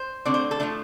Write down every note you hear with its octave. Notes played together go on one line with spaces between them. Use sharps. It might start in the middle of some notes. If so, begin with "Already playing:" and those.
Already playing: C5
D3 A3 C4 D5
C5
A4
A2 F3 A3 D4